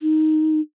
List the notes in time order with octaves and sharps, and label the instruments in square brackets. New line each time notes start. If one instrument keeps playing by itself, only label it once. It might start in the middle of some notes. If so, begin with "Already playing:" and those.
[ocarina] D#4